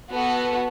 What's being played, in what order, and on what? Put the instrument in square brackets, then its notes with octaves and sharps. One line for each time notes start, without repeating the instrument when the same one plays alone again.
[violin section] B3 F#4 A4